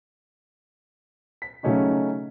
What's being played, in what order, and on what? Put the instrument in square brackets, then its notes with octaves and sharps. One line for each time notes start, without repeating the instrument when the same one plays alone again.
[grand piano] B6
C#3 F#3 A3 C#4 D#4 F#4